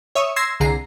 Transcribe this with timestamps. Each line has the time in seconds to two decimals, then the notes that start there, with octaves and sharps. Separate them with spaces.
0.15 C#5 E5 C#6 D#6
0.36 C6 E6 G#6 A#6 C7
0.60 C2 D3 G#4 A#5 C7